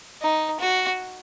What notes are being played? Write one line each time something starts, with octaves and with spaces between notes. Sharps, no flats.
D#4
F#4